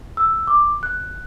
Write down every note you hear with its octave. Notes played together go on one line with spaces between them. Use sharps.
E6
D6
F#6